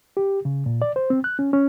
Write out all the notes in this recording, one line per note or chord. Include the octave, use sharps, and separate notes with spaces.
G4
C#3
A#2
D5
C5
C4
F#6
C#4
C#4